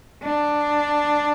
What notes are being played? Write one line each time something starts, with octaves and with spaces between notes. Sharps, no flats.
D4